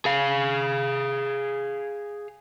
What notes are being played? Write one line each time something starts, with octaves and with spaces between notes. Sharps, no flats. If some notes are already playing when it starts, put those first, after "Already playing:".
G#4 F5